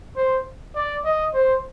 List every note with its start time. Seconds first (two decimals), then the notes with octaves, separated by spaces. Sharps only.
0.16 C5
0.75 D5
1.04 D#5
1.33 C5